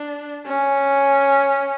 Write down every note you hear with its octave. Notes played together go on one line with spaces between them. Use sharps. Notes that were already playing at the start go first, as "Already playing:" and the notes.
Already playing: D4
C#4